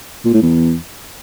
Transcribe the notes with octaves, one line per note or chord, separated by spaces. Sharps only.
A#2
A2
E2